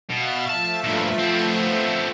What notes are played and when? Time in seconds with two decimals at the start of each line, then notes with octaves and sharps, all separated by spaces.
0.10 B2 E5 F5 A6
0.49 F3 A3 E5 A5
0.84 G2 A#2
1.19 B3 C4